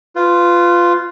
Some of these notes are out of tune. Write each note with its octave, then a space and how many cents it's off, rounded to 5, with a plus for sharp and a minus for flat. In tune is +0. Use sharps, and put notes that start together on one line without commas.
F4 -5 B4 +20